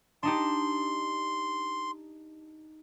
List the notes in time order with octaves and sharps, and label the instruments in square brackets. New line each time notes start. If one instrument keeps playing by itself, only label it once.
[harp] D4 D#4 G4 [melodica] C6